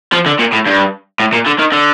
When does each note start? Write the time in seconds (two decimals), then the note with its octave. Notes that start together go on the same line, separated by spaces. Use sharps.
0.13 F3
0.26 D3
0.39 A#2
0.52 A2
0.66 G2
1.20 A2
1.33 A#2
1.46 D3
1.59 D#3
1.72 D3